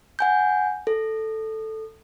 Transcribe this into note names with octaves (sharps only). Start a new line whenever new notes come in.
F#5 G#5 G6
A4